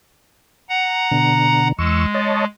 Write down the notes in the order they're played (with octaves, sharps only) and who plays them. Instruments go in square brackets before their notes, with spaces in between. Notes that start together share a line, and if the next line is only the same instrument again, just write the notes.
[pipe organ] F#5 A#5
[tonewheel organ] B2 D3
[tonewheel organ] E2 C#6 E6 [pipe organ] G#3
[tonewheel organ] C#5 D#5 A5